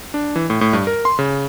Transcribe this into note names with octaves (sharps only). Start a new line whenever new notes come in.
D4
E3
A2
A2
G2
A#4
C6
C#3